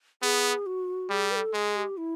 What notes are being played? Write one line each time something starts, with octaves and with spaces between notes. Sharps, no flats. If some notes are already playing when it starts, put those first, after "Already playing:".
B3 G#4
F#4
G3 G#4
B4
A4
G#3 G#4
G4
E4